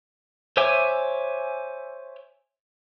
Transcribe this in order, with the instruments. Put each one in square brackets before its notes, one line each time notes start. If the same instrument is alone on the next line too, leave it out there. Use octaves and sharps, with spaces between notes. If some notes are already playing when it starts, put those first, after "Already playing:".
[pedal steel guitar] C5 C#5 E5 G#5 D6